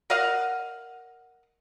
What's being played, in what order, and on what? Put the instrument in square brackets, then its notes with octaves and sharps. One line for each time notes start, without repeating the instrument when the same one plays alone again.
[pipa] A#4 D#5 F5 F#5